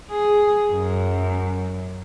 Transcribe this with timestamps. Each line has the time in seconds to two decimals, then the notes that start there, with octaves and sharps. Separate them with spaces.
0.11 G#4
0.73 F#2